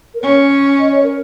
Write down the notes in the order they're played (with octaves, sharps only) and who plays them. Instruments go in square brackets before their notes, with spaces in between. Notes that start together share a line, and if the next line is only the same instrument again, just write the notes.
[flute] A#4
[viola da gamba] C#4 [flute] C#5
[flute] D#5
C#5
A#4